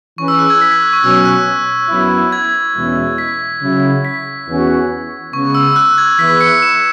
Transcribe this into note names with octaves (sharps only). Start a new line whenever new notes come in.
E3 C#4 G#4 B4 C#6
E6
F#6
G#6
B6
G#6
F#6
C#6
B2 F#3 C#4 E6
F#6
F#2 F#3 B3 E4
G#6
E2 B2 G#3 C#4 E4
B6
C#3 F#3 E4
B6
E2 E3 C#4 F#4
C#3 G#3 B3 C#6
E6
F#6
G#6
E3 B3 E4 G#4 B4 B6
C#7
E7